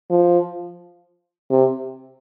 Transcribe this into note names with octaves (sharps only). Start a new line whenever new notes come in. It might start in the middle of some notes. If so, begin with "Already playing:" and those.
F3
C3